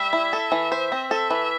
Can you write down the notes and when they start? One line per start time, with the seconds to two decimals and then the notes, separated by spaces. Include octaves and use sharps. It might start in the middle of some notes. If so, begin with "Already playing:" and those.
Already playing: G3 E5
0.13 E4
0.33 A4
0.52 E3
0.72 C5
0.92 C4
1.11 A4 E5
1.30 E3